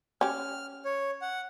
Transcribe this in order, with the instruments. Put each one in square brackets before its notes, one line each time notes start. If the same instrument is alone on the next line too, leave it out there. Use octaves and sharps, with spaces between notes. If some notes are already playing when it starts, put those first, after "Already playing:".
[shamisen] C#4 G4 [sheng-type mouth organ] F6
[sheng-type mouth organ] C#5
F#5